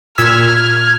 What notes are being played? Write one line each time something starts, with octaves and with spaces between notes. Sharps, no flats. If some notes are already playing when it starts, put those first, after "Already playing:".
A#2 E6 F6 G#6 B6